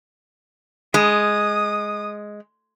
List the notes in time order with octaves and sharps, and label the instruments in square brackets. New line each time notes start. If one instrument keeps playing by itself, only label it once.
[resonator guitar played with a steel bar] G#3 [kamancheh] D#6